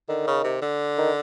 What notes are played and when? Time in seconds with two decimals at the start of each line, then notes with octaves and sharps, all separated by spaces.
0.08 D3 D#3
0.27 C#3
0.44 C3
0.62 D3
0.98 D#3